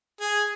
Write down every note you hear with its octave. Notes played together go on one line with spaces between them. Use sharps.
G#4